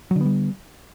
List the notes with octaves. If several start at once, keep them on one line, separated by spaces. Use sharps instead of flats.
D3 F#3 G3 B3